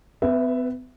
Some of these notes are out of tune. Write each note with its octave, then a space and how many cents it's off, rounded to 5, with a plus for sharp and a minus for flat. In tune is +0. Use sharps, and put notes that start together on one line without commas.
B3 +45 B4 +0 E5 +10